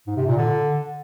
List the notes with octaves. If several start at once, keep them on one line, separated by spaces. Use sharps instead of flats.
G#2
C3
A#2
D3